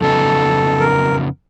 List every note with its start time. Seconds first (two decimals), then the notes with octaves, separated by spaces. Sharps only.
0.01 F2 C#3 F#3 B3 D#4 A4
0.80 A#4